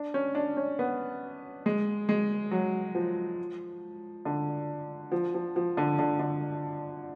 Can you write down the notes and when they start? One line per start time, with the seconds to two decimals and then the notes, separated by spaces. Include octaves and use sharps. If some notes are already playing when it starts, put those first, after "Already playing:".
Already playing: D4
0.14 C#4
0.35 D4
0.57 C#4
0.79 B3
1.66 G#3
2.09 G#3
2.51 F#3
2.95 F3
4.25 D3
5.12 F3
5.34 F3
5.56 F3
5.77 D3
5.99 D3
6.19 D3